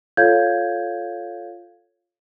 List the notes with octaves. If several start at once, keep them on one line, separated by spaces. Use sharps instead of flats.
F4 A4 C#5 F5 G6 G#6